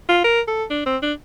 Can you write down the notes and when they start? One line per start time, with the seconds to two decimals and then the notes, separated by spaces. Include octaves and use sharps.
0.09 F4
0.24 A#4
0.48 A4
0.71 D4
0.86 C4
1.02 D4